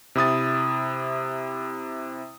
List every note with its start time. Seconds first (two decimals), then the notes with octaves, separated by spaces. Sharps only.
0.15 C3 E4 D#6 A6